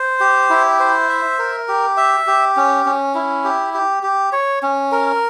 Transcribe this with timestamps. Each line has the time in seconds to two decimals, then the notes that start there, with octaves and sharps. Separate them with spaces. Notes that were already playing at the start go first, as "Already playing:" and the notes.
Already playing: C5
0.20 G4
0.50 E4
0.80 C5
1.09 E5
1.39 A#4
1.68 G4
1.97 E5
2.27 G4
2.57 C#4
2.86 C#4
3.15 E4
3.44 G4
3.74 G4
4.03 G4
4.33 C#5
4.63 C#4
4.92 A#4